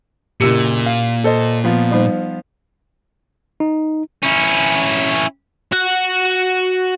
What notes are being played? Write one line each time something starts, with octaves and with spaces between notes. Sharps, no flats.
F#1 A#2 E4 G4 E6 C#7
F5
A4 C5 D#5
F3 B3 F4
G3 D#4 C5
D#4
C#4 E4
F#4 F#5